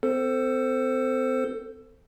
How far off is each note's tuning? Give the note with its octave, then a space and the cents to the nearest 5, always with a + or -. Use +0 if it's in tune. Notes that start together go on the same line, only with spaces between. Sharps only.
C4 -40 A4 +20 C5 +0